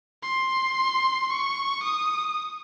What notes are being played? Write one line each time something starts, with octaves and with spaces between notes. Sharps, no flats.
C6
C#6
D#6